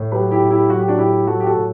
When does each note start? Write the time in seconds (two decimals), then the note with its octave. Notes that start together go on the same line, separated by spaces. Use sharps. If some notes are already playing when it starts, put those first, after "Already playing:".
Already playing: A2
0.12 F#3 G4 B4
0.31 E4 G4
0.41 A2
0.50 E4 G4
0.70 F#3 F#4
0.79 G4
0.88 D4 F#4
0.98 A2 E4 G4
1.27 F#3 F#4 A4
1.40 G4
1.46 F#4 A4
1.56 A2